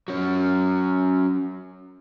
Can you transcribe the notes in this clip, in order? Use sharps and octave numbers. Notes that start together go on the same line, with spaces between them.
F#3 C#4